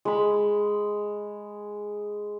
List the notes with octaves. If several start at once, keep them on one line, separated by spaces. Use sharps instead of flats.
G#3 B5